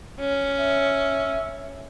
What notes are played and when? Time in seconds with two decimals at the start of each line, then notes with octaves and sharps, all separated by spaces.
0.20 C#4
0.59 E5